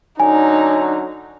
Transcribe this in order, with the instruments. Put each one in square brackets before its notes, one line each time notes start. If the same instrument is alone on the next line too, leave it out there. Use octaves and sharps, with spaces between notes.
[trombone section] D3 F#3 C#4 [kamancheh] D#4 [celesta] G#5